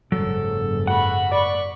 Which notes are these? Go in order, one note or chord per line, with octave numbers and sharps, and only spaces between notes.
F#1 G#2 C#3 F#3 A4
F#4 F#5 B5
D5 B5 C#6